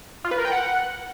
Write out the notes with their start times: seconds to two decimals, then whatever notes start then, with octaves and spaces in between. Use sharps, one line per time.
0.24 F4
0.31 B4
0.38 A#4
0.45 G5
0.52 F#5